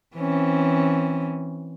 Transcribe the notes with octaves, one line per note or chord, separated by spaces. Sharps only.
E3 C4 C#4